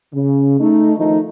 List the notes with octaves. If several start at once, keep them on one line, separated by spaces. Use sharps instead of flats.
C#3
A3 D#4
D#3 F3 A3 D#4